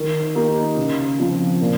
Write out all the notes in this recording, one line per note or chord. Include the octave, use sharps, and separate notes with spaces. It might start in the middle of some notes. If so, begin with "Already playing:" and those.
Already playing: D#3
A#3 D#4 G4
C#3
F3 C4
A#2